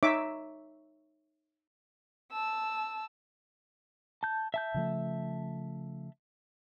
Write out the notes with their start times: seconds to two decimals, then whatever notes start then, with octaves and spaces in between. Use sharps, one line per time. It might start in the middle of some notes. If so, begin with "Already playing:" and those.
0.03 D#4 C#5 E5 D6
2.32 A5 E6
4.23 A5 G6
4.54 E5 A5 G6
4.74 C#3 F3 A3